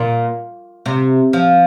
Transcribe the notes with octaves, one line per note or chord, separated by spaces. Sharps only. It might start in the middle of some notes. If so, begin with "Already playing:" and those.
Already playing: A#2
C3
F3